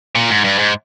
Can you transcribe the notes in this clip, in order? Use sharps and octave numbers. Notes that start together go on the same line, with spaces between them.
A#2
G#2
G2
G#2